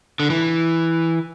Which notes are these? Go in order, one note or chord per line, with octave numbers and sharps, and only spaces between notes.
D3
E3